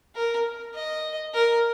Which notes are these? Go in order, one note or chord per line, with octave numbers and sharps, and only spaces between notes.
A#4
D#5
A#4